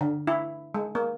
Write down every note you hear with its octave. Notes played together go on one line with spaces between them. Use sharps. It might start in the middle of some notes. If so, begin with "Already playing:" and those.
D3
E4
G#3
A#3